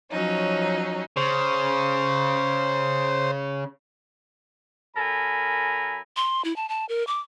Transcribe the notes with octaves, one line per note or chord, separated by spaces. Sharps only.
F3 F#3 C#4 D#4
C#3 C5
F#2 A4 A#4 G#5 B5
C6
E4
A5
A5
A#4
D6